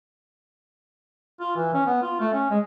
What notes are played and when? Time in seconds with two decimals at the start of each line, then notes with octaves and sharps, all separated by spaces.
1.40 F4
1.56 E3
1.74 C#4
1.86 B3
2.02 F4
2.20 A3
2.33 C#4
2.50 G#3